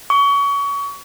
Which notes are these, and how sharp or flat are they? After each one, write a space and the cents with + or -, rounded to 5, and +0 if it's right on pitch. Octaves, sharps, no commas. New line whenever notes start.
C#6 +30